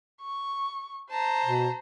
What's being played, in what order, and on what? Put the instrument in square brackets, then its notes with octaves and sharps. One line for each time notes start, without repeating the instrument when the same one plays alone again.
[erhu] C#6
[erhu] C5 [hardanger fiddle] A5 A#5
[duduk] B2